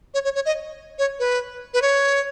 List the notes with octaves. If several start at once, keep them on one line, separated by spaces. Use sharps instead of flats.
C#5
C#5
C#5
D#5
C#5
B4
B4
C#5